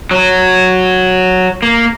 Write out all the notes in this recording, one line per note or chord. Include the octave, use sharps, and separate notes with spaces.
F#3
A#3